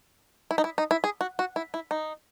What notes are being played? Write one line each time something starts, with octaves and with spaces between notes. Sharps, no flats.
E4
D#4
E4
D#4
E4
G#4
F#4
F#4
E4
E4
D#4